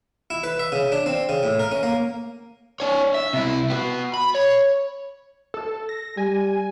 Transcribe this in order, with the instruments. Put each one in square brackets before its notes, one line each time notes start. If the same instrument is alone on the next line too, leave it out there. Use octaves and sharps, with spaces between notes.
[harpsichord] E4
B4
E5
C#3
D4
C4
C#3
A2
A#4
C#4
A#3
[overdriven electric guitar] D4 C#5
E5
C3 E4
B3 F#4
B5
C#5
[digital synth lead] A4
A#6
[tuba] G3 [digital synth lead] G#5